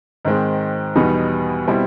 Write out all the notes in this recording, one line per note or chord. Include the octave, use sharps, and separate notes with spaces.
G#2 D#3 G#3 C4
E2 B2 G3 B3 D#4
B2 G3 C4 E4